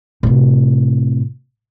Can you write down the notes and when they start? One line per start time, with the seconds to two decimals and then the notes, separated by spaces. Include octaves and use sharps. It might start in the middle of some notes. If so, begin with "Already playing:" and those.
0.23 A2 C3